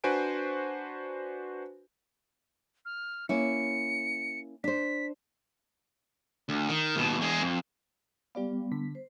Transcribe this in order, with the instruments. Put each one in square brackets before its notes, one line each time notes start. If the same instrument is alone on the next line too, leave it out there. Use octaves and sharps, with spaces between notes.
[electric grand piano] D4 F#4 B4 C5 G#5 D7
[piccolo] F6
[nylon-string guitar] A#3 C#4 E4 [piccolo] C#7
[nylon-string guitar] D4 C5 [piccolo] B6
[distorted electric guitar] D2
D#3
D#2 B2
E2 G#3
F2
[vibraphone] G3 B3 [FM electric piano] G4 D5 F5
[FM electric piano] D3 B6
[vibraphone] C5